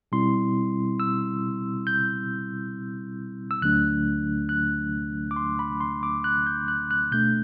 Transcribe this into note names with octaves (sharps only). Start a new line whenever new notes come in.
B2 G3 C4 E4 C6
E6
G6
E6
D2 D3 F#3 A3 D4 F#6
F#6
D6
C6
B5
C6
D6
F#6
G6
F#6
F#6
B2 A3 D4 G6